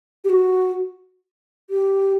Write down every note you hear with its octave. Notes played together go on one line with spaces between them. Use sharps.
G4
F#4
G4